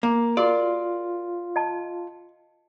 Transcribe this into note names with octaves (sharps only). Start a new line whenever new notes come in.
A#3
F4 F#4 G#4 A#4 D5
D#5 A5